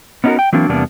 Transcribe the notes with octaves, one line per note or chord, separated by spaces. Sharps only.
B3 C#4 D#4 E4 F#4 A#4
G5
E3 F#3 A#3 C4 D4
E2 C3 G3 A#3 B3 D4